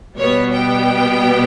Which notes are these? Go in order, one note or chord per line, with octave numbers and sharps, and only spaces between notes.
B2 G3 B3 C#5
G5